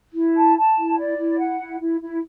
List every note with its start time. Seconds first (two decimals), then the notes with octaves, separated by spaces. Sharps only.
0.14 E4
0.35 A5
0.56 A5
0.77 E4
0.97 D5
1.18 E4
1.39 F#5
1.59 E4
1.80 E4
2.01 E4